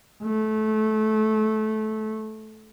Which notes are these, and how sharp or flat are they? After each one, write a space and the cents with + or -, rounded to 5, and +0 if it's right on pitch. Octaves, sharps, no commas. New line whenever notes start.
A3 -20